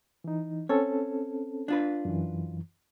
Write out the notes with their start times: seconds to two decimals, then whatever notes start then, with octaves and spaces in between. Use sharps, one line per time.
0.24 E3 D#4
0.69 C4 C#4 A4 C#5
1.68 D4 F4 B4
2.05 F#2 E3